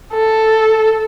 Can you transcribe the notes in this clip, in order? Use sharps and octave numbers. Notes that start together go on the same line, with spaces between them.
A4